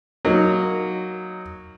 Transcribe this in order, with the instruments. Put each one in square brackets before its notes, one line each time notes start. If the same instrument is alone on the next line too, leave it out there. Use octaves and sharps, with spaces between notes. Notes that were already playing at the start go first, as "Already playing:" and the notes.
[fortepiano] F#3 A#3 D#4